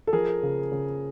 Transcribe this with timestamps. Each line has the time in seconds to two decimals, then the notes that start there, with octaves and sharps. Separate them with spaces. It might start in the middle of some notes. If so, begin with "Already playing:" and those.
0.07 A4
0.13 F3 G#4 A#4
0.43 C#3
0.72 C#3